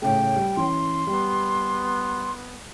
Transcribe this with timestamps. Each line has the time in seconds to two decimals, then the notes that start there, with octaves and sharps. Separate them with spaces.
0.02 A2 C#3 A3 G5
0.36 G3
0.57 E3 C#4 C6
1.07 G3 B3